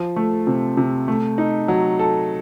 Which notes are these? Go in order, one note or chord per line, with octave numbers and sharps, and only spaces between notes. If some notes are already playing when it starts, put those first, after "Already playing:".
Already playing: F3
A3
C3
C3
A3
D#4
F#3
A4